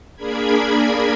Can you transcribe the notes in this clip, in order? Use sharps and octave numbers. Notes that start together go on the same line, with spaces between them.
A#3 D4 G#4 A#4 B5 G#6